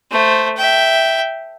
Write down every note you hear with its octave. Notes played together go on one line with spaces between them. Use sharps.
A3 C5
E5 G5